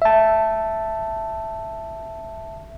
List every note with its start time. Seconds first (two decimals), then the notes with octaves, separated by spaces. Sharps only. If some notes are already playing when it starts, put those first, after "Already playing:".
0.02 E5 A5